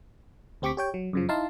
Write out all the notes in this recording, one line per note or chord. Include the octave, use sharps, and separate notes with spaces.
D2 C4 G4 C#6 D6 B6
G4 C#5 G5
F#3
F#2 C#3 F3
D#4 E4 F5 A5 C6